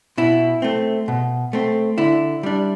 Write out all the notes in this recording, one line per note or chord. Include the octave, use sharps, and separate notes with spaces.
B2 E4
A3 C4
B2
A3 C4
D3 E4
G3 D4